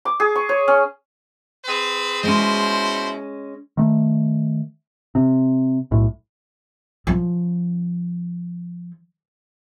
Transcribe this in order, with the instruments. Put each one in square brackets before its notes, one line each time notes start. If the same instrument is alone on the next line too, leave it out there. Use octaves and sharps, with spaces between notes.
[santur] D6
G#4
C#6
C#5
C#4
[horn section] C4 G#4 B4
[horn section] B2 E4 C5 [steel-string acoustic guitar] G#3 C#4
[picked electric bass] D#3 A3
C3
B1 A2
[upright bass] F3 C#4